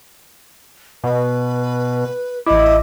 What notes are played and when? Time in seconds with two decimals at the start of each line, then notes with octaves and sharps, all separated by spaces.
1.04 B2 B4
2.47 A1 E4 D#5 D6